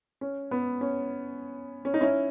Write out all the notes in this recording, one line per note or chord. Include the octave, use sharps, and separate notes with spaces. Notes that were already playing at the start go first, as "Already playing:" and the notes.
C#4
B3
C#4
C#4
D#4
C#4 E4